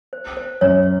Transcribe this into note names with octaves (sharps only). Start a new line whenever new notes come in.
C5
C5
F#2 C#5